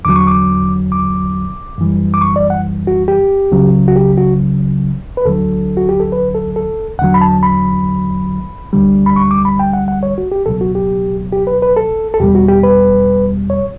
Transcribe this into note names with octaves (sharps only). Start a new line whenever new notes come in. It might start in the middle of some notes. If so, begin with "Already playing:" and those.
E2 D3 F#3 D6
C#6
D6
D6
F#2 E3 G3
D6
C#6
D5
F#5
F#4
G4
C#2 C#3 F#3
F#4
G4
F#4
B4
D2 D3 F#3 A4
F#4
G4
A4
B4
A4
A4
E2 D3 F#3 F#5
B5
A5
B5
D2 D3 G3
B5
C#6
D6
B5
G5
F#5
F#5
C#5
F#4
G4
C#2 B2 F#3 A4
F#4
G4
G4
B4
B4
A4
A4
E2 B2 G3 G4
F#4
G4
B4
C#5